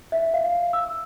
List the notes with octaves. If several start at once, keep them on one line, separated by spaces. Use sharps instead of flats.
E5
F5
E6